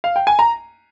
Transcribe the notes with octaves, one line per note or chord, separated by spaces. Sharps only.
F5
G5
G#5
A#5